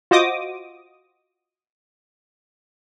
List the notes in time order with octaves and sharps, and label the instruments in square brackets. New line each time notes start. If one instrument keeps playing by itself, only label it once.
[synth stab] F4 F#4 C5 D#5 D6 D#6